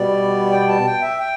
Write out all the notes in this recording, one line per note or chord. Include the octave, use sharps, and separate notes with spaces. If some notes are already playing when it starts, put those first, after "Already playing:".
Already playing: B2 G3 B3 D5
G5
A5
G5
E5
G5